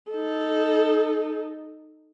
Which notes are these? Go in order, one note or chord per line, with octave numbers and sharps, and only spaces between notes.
D#4 A4